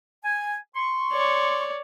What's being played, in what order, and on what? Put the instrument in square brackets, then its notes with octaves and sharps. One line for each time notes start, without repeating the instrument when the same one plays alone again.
[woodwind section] G#5
C6 C#6
[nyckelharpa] C#5 D5